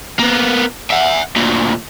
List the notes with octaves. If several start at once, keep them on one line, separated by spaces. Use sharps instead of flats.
A#3 B3
E5 F#5
D2 A#2